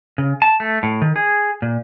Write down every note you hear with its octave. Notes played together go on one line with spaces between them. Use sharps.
C#3
A5
A3
A2
D#3
G#4
A#2